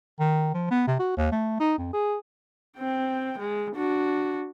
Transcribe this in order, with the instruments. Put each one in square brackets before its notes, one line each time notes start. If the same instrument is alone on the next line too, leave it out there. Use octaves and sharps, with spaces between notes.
[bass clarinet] D#3
F3
B3
C3
F#4
D#2
A3
D#4
F2
G#4
[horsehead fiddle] C4 G5
G#3
D4 F#4